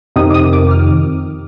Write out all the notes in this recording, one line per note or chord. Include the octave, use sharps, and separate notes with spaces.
F2 C3 D#3 D#6
D6
D#6
D6
F6